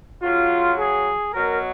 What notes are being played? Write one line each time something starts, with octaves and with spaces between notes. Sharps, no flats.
C#3 F#3 F4
G#4
B2 F#3 A#4